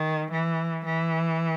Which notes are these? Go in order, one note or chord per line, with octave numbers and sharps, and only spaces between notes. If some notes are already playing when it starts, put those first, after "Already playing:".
Already playing: D#3
E3
E3